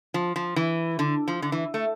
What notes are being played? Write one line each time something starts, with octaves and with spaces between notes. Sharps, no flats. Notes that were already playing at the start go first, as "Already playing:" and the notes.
F3
F3
E3
D3
F3
D3
E3
A3